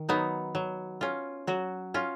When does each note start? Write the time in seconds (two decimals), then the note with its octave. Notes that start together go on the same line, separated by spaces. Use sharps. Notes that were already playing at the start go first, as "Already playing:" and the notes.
Already playing: D#3
0.09 F#3 B3 D#4
0.55 F#3
1.01 C#4 F4
1.47 F#3 F#4
1.94 C#4 F4